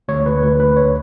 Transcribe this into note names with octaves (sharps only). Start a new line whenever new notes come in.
D2 C#5
D2 B4
D2 B4
D2 B4
C#2 C#5